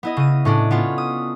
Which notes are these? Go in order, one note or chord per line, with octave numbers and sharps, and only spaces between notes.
B3 E4 D#5
C#3 D#7
A2 C#4 D4
B3 C#4 F4
D#6